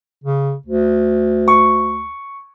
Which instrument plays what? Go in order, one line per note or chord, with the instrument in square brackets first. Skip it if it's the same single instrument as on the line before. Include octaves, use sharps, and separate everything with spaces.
[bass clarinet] C#3
D2
[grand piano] C#6